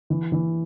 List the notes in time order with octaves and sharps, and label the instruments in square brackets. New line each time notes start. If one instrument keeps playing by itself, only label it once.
[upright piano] E3
E3